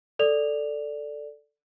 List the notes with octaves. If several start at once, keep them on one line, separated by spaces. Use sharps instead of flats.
A4 D5 F7